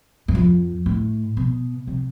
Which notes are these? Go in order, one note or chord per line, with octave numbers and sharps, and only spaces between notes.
F#2
F2
A2
B2
C3